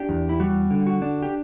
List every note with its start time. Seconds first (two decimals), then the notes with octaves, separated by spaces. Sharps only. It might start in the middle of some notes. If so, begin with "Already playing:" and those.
Already playing: D4 G4
0.09 E2
0.29 E4
0.40 G3 F#4
0.71 D3
0.87 F#4
1.02 D4
1.23 G4